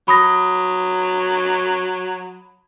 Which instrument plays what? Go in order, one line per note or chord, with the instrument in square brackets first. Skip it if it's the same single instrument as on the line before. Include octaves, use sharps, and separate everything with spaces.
[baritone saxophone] F#3 [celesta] B5 D#6 A#6